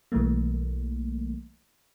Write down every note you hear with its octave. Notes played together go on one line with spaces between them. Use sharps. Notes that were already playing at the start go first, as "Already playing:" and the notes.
B1 E3 G3 A3 A#3